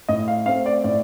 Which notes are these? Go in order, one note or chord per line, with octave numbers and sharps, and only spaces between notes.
A2 D#5
F5
A3 C4 F5
D5
A2 D5